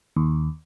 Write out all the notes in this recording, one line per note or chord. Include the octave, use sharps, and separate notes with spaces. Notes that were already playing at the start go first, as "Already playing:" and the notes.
D#2